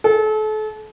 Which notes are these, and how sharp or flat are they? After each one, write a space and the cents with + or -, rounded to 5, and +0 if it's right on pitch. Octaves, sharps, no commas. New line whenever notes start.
A4 -35